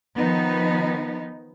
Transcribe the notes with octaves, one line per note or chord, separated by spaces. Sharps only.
D#3 F3 B3 D#4